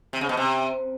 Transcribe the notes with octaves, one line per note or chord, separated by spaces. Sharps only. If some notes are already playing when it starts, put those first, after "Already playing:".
C3
C#3
B2
C3